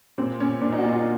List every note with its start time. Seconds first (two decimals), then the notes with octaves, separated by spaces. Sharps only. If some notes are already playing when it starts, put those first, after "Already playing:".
0.18 A#2 C4
0.40 A#2 C#4
0.61 A#2 D4
0.73 D#4
0.78 F#4
0.83 A#2 F4
0.94 F#4